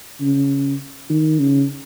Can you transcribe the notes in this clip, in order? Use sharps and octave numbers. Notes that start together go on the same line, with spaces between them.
C#3
D#3
C#3